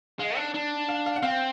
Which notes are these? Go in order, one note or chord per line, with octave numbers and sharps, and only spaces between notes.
G#3 F5
D4
D4
F5
F5
F#5
C4 F5